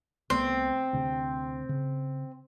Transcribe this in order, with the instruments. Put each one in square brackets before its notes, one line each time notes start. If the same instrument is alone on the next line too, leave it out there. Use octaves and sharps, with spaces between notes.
[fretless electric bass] C2 A3 B3 [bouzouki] C4
[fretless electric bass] D2 C3
C#3